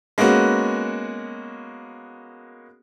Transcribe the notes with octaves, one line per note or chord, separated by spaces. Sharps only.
G#3 A#3 B3 C#4 F#4